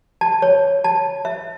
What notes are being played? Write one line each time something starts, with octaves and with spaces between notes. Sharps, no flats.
A5
C#5
A5
E5